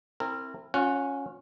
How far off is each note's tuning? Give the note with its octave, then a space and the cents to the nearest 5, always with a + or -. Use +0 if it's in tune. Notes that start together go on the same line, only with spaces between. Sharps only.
C4 +20 E4 +0 A#4 -25
C#4 +0 F4 +45 F#5 +0